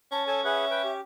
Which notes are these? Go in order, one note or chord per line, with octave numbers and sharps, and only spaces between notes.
C#4 A5
A4 C#5 G#5 A5
G#4 B4 E5 F#5
B4 G5
G4